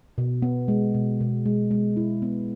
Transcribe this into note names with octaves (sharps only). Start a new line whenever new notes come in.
B2
B3
G#3
B2
B2
G#3
G#3
E4
B3